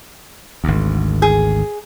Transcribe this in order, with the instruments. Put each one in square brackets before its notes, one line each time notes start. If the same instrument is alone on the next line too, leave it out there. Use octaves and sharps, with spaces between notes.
[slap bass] G#1 D2
[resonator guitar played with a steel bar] G#4